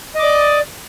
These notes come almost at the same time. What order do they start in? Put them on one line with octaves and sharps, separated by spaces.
D#5 D6 D5